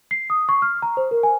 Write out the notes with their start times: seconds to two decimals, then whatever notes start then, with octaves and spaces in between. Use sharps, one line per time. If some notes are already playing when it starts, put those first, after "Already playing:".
0.11 C7
0.30 D#6
0.49 C#6
0.62 F6
0.82 A#5
0.97 C5
1.11 A#4
1.23 G#5